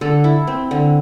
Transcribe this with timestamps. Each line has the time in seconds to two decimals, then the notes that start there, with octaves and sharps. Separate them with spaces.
0.01 D3 A4
0.24 E4
0.47 C4
0.71 D3